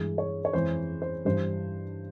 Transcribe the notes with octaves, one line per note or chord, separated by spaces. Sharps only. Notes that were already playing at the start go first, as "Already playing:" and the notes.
Already playing: G2 E3 G#3
C#5
C#5
F2 E3 G#3 C5
C5
G2 E3 G3 C5